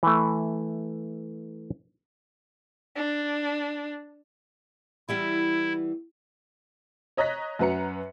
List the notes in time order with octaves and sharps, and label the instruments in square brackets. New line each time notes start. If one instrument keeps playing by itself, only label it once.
[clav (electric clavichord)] E3 A3
[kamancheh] D4
[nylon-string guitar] E3 G3 B3 [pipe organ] E4
[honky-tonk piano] C#5 D#5 A#5 F#6 A#6 B6
F#2 F#4 B4 A#5 C#7